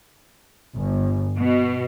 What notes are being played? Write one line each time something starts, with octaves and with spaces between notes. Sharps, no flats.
G1
B2